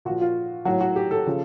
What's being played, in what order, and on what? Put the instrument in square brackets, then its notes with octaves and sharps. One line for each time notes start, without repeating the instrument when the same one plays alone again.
[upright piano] A#2 F3 F#4
F4
A2 F#3 F#4
F#4
G4
A4
C#3 F3